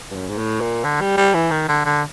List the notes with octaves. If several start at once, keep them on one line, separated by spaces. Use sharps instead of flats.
G2
F#2
G#2
A2
A#2
D3
G3
G3
E3
D#3
D3
D3